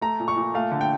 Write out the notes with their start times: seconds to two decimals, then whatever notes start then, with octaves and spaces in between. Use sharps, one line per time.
0.01 A3 A#5
0.20 A#2
0.28 C#6
0.37 A#2
0.54 A3 F5
0.72 D3
0.81 G5